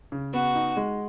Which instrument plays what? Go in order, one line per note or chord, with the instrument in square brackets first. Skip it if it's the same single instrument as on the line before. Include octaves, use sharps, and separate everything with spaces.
[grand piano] C#3
[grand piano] B3 [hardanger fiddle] F#4
[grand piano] D#4
G#3